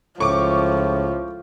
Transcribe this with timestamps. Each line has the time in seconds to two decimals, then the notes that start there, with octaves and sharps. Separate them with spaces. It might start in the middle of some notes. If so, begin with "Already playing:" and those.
0.20 C#2 A2 F3 C#6 D6